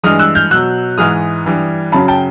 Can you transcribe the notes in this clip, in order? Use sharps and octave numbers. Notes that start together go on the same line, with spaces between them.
G2 E3 G#3 D#6 F6
E6 F#6
F6 G6
B2 F#3 E6 F#6
G#2 E3 G#3 D#6 F6
G2 E3 G3
F#2 C#3 F#3 A5 B5
G5 A5